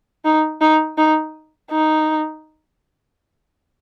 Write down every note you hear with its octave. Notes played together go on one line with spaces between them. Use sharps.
D#4
D#4
D#4
D#4